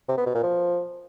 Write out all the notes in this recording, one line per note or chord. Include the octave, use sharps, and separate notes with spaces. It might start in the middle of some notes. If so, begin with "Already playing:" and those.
C3
B3
B2
A#2
F3